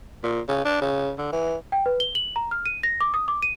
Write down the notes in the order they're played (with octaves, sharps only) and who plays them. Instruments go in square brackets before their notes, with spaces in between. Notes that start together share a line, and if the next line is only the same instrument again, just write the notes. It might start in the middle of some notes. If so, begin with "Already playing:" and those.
[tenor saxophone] A#2
C#3
D4
C#3
D3
E3
[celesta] G5
B4
G7
F#7
A#5
F6
D#7
A#6
D6
D#6
D6
D#7